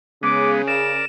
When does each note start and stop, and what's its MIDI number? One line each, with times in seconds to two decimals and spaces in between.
0.23 1.01 49
0.23 0.62 56
0.23 0.62 59
0.23 0.51 86
0.67 1.05 70
0.67 1.05 74
0.67 1.06 100